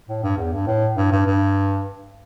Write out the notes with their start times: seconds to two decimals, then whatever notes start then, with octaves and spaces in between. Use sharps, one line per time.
0.09 A2
0.23 G2
0.38 E2
0.53 G2
0.67 A2
0.97 G2
1.12 G2
1.27 G2